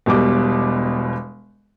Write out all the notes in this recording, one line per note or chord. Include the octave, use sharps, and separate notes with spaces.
E1 B2 G3 D6